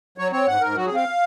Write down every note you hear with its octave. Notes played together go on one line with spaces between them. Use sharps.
F#3 C#5
C4 C#5
G#2 F#5
G#2 A#4
F#3 F#4
G#4
C4 F5